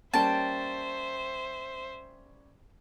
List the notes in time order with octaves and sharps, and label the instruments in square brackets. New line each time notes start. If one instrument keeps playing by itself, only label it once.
[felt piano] G3 A#3 C#4 [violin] C5 E5 [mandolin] G5 A5